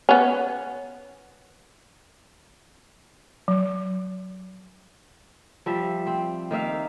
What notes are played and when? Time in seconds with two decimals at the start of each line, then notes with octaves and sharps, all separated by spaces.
0.09 B3 C#4
3.48 F#3
5.66 F3 G3 E5
6.07 C4
6.51 D#3 A#3 E5 F5